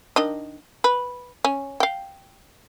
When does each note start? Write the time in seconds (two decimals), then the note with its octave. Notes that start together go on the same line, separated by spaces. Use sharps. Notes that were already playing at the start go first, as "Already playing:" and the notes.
0.16 D#3 D4 D#5
0.84 B4
1.45 C#4
1.80 F5 G5